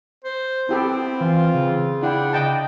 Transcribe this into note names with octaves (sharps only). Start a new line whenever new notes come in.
C5
B3 C4 E4 G4 A4
E3 F4
C#3
D4 E4 F#5 G5
D#5 G5 A5